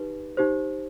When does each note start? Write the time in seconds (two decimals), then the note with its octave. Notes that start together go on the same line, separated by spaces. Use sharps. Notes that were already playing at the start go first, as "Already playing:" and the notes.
Already playing: D#4 G4 B4
0.37 D#4 G4 C5